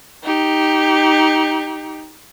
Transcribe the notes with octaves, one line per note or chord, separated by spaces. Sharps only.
D#4 G4